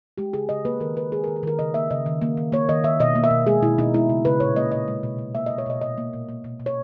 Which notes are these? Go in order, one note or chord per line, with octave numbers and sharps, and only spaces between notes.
G#3 G4
C#3 G#4
C#3 D#5
A#3 B4
D#3 A#4
D#3 B4
G#3 G#4
D#3 A#4
G#4
D#3 A#4
C#3 D#5
A#3 E5
C#3 D#5
D#3
A#3
D#3
A#3 C#5
D#3 D#5
D#3 E5
B2 D#5
A#3
E5
B2
G#3 G#4
B2 E4
B2 D#4
G#3 E4
C#3
C#3 B4
A#2 C#5
A#3 D#5
A#2 D#5
G#3
B2
B2
A#3 E5
B2 D#5
C#5
B2 D#5
A#2 D#5
A#3
A#2
A#3
B2
B2
C#5